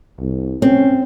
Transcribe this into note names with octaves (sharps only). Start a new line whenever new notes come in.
C2
C4 C#4